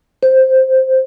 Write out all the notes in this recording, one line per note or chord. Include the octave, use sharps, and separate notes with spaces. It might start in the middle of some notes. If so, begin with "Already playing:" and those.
C5